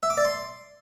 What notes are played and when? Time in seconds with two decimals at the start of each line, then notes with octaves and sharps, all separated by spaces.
0.03 E5
0.10 D6
0.17 D5
0.25 C6